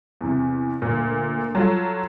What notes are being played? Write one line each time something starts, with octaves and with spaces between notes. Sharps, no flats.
E2 C3
D2 A#2
F#3 F4 A4